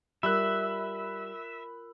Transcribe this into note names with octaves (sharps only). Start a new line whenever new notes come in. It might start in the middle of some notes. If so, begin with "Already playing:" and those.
G3 F4 A#4 E5 B5 E6 F#6